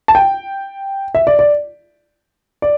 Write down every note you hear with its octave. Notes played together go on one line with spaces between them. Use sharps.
A5
G5
E5
D5
D5
D5